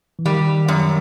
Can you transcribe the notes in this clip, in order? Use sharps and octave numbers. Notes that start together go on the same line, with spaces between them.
E3
D#3 G3
F#2